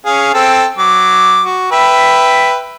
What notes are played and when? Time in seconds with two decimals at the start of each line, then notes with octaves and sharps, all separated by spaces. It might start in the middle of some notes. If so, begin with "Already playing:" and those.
0.06 C#4 G#4 F5
0.34 C4 A4 G5
0.78 F#3 D6
1.45 F#4
1.72 B4 E5 G5